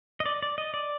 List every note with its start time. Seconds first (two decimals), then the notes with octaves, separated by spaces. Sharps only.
0.20 D#5
0.26 D5
0.43 D5
0.58 D#5
0.74 D5